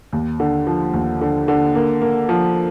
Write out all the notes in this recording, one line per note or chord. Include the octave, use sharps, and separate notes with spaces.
D#2
D3
F3
D#2
D3
D3
A#3
A#3
F3